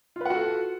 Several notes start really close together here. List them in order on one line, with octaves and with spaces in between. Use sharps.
F4 B4 F#5 F#4 A4